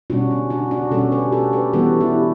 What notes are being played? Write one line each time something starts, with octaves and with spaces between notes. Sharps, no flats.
B2 G3 C#4 D4 F#4
D4
D4 F#4
D4 F#4
B2 G3 C#4 F#4 A4
G4 B4
F#4 A4
G4 B4
E3 G3 B3 F#4 A4
E4 G4